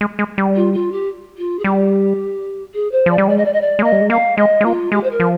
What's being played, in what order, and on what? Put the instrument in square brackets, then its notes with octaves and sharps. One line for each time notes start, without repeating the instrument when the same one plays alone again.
[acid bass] G#3
G#3
G3
[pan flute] F4
F4
G4
F4
G#4
[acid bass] G3 [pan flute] G4
[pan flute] G#4
C5
[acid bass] F3 [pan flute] D5
[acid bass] G3
[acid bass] G#3 [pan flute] D5
[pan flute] D#5
D5
D#5
D5
[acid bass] G#3
[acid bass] A#3 [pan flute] D#5
[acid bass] G3
G#3
[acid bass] A#3 [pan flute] F5
[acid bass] G#3 [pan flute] D#5
[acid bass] G#3
[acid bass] A#3 [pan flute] F4
[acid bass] G#3 [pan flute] G4
[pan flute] C5
A#4
[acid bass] F3